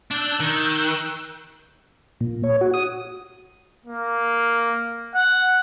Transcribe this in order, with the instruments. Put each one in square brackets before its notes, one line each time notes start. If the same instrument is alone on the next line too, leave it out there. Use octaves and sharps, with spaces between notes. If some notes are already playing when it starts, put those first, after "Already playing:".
[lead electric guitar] D4 D5 [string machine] E6 F#6 G6
[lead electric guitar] D#3
[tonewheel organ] A#2
C#5
F#4
D#6
[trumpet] A#3
F#5